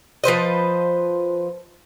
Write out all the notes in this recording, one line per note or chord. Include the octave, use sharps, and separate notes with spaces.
F3 B4 C5 D#5